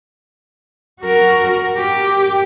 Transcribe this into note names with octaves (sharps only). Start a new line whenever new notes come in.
F#4 A#4
G4